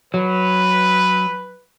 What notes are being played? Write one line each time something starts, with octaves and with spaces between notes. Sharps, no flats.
F#3 B4